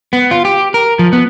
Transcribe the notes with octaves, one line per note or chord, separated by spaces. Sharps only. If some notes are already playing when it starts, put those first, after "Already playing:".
B3
F4
G4
A#4
F3
B3